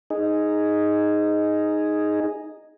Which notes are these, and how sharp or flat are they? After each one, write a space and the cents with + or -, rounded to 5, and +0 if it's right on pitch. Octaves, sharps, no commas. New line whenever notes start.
D#4 +0 G#4 +0